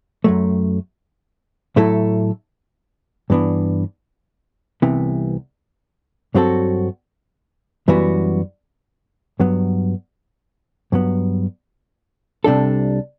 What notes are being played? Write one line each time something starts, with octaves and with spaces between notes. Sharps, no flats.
F#2 F#3 A3
A2 F#3 A3 E4 A4
G2 E3 B3 D4
C2 C3 E3 B3
G2 F#3 C4 F#4 A4
F#2 E3 G3 B3 F#4
G2 F#3 B3
G2 F#3 B3
C2 C3 G3 D4 A4